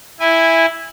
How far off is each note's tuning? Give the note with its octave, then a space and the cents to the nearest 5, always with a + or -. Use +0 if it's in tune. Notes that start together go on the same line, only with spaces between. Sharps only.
E4 +0 G#5 -20